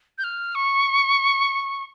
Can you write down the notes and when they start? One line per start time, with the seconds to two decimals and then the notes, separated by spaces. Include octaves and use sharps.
0.18 G6
0.24 F6
0.55 C#6